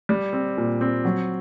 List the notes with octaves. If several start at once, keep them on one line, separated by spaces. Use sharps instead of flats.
G3
C4
A#2
C4
F#3